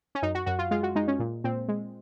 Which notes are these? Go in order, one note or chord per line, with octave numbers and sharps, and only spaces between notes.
C#4
F#2 D#4
F#4
F#2 F#4
F4
G#3 F4
F#4
G#3 D#4
C#4
A#2
A#2 C4
G#3